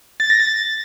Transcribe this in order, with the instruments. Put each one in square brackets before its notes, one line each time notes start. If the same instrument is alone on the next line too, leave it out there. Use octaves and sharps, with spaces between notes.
[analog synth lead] A6
A#6
A6